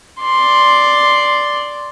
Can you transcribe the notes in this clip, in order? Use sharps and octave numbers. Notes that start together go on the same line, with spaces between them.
D5 C6